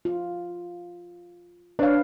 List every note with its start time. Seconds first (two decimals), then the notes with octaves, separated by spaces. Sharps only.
0.05 F4
1.79 D4 B4 C#5 F5